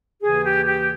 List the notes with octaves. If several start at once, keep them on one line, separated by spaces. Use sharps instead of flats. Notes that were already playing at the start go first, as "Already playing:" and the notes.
D#2 C#3 E3 G#4
G4
G4